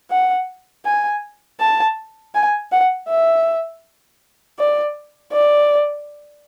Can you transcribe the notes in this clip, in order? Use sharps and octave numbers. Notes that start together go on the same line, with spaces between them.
F#5
G#5
A5
G#5
F#5
E5
D5
D5